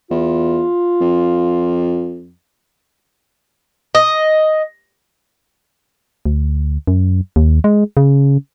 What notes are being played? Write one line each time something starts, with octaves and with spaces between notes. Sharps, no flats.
E2 F4
F2
D#5
D2
F#2
D#2
G#3
C#3